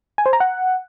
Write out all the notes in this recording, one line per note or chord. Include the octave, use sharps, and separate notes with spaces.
G#5
C5
A#5
F#5